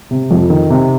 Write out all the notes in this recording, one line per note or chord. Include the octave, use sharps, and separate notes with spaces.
C3
F2
D#3
C3